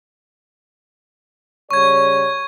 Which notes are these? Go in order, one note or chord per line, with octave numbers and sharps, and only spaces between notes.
C#3 G3 C#5 C#6 G#6